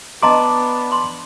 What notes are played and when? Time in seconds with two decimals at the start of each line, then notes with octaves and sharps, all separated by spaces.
0.23 B3 D4 D#5 A5 A#5 C6 D6
0.92 C6